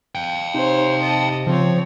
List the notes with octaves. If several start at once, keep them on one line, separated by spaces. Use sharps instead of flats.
F5 G5
C3 D#4 C5 C#5
D#5 A5
C#3 F3 C4 C#5